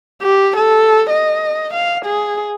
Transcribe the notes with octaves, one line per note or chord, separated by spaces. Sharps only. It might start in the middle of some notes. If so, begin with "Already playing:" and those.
G4
A4
D#5
F5
G#4